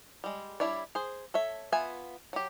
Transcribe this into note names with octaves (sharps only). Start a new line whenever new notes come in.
G3 G#3
G3 D4 E4 C#5 D5
G#4 C5
A4 C#5 E5
B3 F4 E5 G#5
F#3 G4